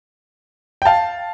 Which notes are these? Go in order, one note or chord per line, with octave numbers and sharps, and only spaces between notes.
G5
F5 A5